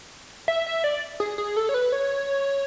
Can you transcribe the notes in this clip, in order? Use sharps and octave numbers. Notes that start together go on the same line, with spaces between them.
E5
E5
D5
G#4
G#4
A4
C#5
B4
C#5